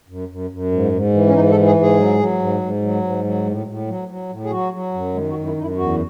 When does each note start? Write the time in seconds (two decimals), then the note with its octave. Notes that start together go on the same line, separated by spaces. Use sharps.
0.09 F#2
0.29 F#2
0.50 F#2
0.72 G#2
0.93 G#2
1.13 E3
1.27 C#4
1.34 G#2 D#4
1.51 A4
1.55 E3
1.66 G#4
1.77 G#2 G#4
1.97 F#3
2.19 F#3
2.39 G#2
2.62 G#2
2.82 F#3
3.03 G#2
3.24 F#3
3.46 A2
3.67 A2
3.88 F#3
4.08 F#3
4.29 A2
4.44 G#4
4.50 F#3 F#4
4.72 F#3
4.93 F#2
5.14 D#3 G#3
5.30 F#4
5.34 F#2
5.45 E4
5.57 F#2 D#4
5.61 E4
5.77 E2 F#4